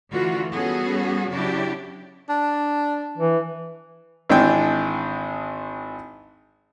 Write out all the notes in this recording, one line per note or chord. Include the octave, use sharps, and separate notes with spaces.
D3 E3 A3 F4 F#4
G3 B3 C#4 F#4 G#4 A4
C#3 F#3 D4 E4 F#4 G4
D4
E3
G#1 E3 G#3 D4 G#4 G5